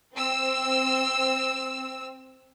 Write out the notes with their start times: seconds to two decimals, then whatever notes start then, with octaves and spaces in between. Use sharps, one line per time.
0.15 C4 E6